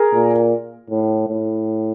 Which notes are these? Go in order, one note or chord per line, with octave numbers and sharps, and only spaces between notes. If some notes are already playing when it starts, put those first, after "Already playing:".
Already playing: G#4 A#4
A#2
A2
A2